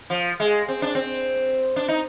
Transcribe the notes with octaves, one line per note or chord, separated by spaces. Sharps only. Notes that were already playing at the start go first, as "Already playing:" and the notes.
F3
G#3
C4
D4
C4
D4
D#4